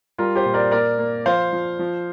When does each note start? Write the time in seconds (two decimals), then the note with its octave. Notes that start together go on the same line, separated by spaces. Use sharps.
0.18 G3 F4 A#4
0.35 G4 C5
0.46 A#2
0.54 A#4 D5
0.71 A#3 A#4 D5
0.99 A#3
1.26 F3 C5 F5
1.53 F3
1.79 F3